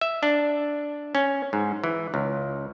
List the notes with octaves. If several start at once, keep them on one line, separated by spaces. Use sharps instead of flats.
E5
D4
C#4
G#2
E3
C#2